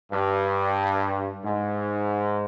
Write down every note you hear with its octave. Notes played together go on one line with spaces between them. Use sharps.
G2
G#2